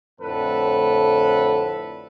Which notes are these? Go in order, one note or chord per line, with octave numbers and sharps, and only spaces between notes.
F2 A2 D3 A4 B4